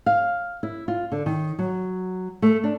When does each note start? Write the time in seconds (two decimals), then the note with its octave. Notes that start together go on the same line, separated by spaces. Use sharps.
0.06 F5
0.63 E4
0.88 F4
1.12 D3
1.26 D#3
1.59 F#3
2.42 A3
2.64 D4